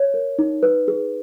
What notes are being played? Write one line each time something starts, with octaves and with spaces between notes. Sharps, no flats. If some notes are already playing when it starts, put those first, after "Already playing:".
Already playing: C#5
A#4
D#4
B4
G#4